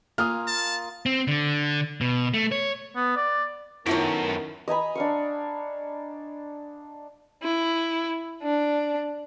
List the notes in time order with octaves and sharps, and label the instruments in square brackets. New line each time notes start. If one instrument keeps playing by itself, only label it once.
[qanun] A#3 F4 G#5 [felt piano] D#6 F6
[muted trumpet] A5
[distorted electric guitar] C4
D3
B2
A3
C#5
[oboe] B3
D5
[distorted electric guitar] F#2 [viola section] D#3 [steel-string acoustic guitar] F#3 A3 B3 [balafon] E4 F4
[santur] D#5 G#5 A#5 B5
D4 F5 C#6
[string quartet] E4
D4